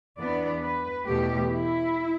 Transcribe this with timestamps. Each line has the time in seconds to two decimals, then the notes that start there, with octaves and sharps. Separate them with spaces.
0.18 E2 E3 B3 D4 D5
0.62 B4
1.06 E2 B2 A3 G4
1.50 E4